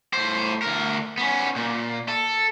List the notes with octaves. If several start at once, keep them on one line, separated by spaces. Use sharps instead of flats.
A2 C5
D2 A#4
B3 C#4
A#2
A4